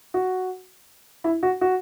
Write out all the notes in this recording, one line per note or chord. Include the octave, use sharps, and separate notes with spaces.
F#4
E4
F#4
F#4